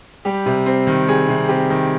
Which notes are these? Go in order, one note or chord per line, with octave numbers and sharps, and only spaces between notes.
G3 G4
C3
C4
D#3
G3 G#4
C3
C4 G4
D#3